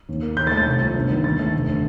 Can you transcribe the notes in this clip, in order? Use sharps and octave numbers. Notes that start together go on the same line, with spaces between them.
D#2
A#3
D#2 G6
A6
A3
A6
C2
F3
G1
D#3
D#2 A6
A3
F1
D3